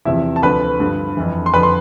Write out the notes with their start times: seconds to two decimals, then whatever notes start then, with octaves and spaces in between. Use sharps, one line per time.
0.05 E2 C3 F3 E4 E5
0.36 A5
0.42 D2 D3 F3 B4 B5
0.80 G2 D3 F3
1.17 F2 E3
1.46 C6
1.53 F2 D3 F3 B4 B5
1.63 C6